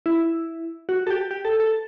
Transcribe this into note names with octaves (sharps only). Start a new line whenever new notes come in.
E4
F#4
A4
G4
G4
A4
A4